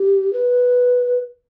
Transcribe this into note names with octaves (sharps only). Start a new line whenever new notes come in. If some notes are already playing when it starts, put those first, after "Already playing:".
Already playing: G4
B4